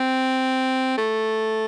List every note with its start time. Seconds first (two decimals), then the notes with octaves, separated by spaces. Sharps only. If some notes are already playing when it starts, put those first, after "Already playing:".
Already playing: C4
0.98 A3